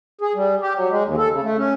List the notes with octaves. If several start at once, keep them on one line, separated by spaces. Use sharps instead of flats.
G#4
G3
G4
F#3
G#3
D#2
A4
C#3
A3
C#4